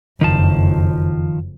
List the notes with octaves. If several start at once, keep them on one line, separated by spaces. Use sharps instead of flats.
F#1 F2 D#3 F3 A5